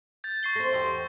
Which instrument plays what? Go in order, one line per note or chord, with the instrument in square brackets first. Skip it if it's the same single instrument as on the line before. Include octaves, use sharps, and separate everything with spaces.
[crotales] G6 A6
C#6 C7 G7
[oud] A3 C4 [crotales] A#6
[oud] E2 G4